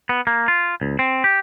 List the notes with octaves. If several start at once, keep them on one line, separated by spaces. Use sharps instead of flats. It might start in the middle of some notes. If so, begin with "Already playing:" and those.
B3
A#3
F4
C#2
C4
G4